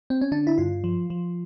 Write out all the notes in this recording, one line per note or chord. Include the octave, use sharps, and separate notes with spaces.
C4
C#4
D3 D4
E4
G2 F4
F3
F3